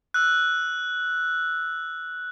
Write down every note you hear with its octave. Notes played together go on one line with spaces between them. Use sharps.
E6 F#6